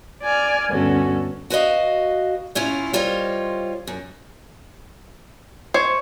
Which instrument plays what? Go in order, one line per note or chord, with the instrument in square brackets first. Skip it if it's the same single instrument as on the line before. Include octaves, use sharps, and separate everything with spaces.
[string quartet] D5 G#5 F6
D2 G2 B3 C#4 F#4 A4
[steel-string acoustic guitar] F#4 B4 C5 D#5 F5
A2 C#4 E4 F4
G3 F4 A#4 C5 C#5 D#5
F#2
[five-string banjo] C5 [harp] C#5